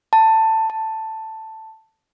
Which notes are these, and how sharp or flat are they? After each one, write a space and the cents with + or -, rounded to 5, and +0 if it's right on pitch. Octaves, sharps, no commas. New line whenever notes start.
A5 +15
A5 +5